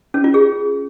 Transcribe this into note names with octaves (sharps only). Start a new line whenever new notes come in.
C#4
F4
G#4